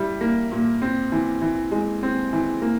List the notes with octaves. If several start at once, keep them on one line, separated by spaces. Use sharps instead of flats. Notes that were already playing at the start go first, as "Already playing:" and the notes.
Already playing: G3 E4
A#3
A#2
C4
E3
E3
G#3
C4
E3
A#3